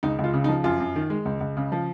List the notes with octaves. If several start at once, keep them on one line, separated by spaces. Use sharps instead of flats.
C#2 D#4
C#2
F4
C#3
D#4
F3
F#2 F4
F#2
D#3
G#3
C#2
C#2
C#3
F3